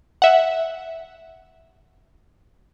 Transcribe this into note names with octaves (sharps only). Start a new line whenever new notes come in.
E5 F#5